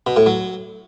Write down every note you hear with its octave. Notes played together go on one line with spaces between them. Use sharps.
B2
A2
F#3